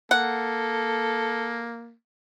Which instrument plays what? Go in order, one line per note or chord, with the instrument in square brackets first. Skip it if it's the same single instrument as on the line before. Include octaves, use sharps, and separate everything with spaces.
[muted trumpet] A#3 [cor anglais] A4 [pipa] F#5